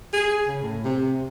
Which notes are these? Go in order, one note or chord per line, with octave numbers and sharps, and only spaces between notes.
G#4
C#3
A2
C3